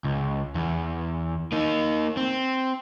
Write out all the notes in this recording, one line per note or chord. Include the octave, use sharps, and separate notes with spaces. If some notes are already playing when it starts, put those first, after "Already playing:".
C#2
E2
A#3 D#4
C4